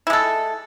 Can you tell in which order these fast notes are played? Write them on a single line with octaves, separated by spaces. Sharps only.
E4 G#3 A4